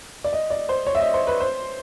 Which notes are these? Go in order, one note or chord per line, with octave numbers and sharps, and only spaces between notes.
D5
D#5
D5
C5
C#5
E5
D#5
C5
B4
C5